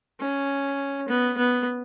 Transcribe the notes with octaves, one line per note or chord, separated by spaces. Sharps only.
C#4
B3
B3